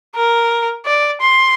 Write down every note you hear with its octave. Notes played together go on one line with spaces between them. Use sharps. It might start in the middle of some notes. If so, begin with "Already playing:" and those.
A#4
D5
C6